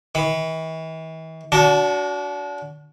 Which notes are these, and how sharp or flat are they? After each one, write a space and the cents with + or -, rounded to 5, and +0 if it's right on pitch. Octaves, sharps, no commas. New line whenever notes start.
E3 -45 B5 +0
D4 -35 F#4 +0 A5 +0